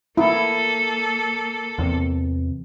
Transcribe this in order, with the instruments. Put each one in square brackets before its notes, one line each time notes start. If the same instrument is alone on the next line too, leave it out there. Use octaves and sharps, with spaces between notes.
[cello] A#3 A4 [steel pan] E4
[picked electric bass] E2 C3